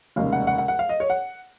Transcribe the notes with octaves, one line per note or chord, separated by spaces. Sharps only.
F1 D#2 C#3 G#3 F5
F#5
F#5
F#5
F#5
F5
D#5
C#5
F#5